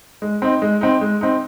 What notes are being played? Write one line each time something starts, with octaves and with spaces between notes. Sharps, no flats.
G#3
C4 D#4
G#3
C4 D#4
G#3
C4 D#4